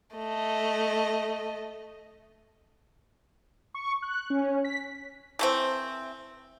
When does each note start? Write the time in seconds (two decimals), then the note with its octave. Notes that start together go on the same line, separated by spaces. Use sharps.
0.15 A3 D#5
3.74 C#6
4.02 F#6
4.30 C#4
4.65 B6
5.39 E3 A3 C4